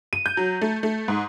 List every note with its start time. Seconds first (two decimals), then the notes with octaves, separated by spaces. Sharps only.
0.13 D#7
0.26 G6
0.37 F#3
0.62 A3
0.83 A3
1.08 G#2